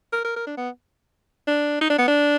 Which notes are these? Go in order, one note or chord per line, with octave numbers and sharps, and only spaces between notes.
A#4
A#4
A#4
D4
B3
D4
D#4
D4
B3
D4